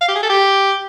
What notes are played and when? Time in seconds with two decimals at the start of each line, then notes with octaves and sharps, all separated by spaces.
0.01 F5
0.08 G4
0.15 G#4
0.23 A4
0.30 G4